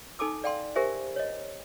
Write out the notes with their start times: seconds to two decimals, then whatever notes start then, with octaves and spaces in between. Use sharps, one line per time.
0.19 D#4 A4 G#5 A5 D6 E6
0.44 D5 F5 G5 A5 C6
0.75 G4 A#4 C5 E5 G#5
1.16 C#5 D#5